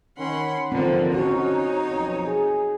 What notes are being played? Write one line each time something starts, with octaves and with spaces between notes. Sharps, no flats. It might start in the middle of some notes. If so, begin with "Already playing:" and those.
D#3 C#4 F#5 B5 C6
G#1 D3 D#3 F3 A#3 C4
C#4 D#4 F#4 C#5
B1 F2
G#4